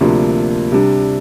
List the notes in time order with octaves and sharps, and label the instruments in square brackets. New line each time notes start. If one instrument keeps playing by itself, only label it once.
[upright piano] D2 C3 F3 A#3 D4
C3 G3 D4